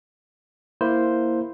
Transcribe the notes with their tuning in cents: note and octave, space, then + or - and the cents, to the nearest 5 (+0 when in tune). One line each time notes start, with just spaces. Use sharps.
A#3 +0 E4 +0 C5 +0